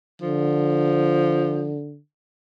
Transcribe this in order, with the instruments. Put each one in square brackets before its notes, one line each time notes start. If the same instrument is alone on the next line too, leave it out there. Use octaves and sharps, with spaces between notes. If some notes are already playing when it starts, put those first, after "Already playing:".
[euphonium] D3 [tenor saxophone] F3